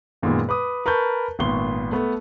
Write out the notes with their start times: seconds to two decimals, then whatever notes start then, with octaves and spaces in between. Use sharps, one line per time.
0.22 F#2 A#2 D#3 G#3 B3
0.49 B4 D6 D#6
0.86 A#4 B4 A5 C#6 G6
1.39 G#1 A#2 B3 C6 C#6 G7
1.92 A3 B3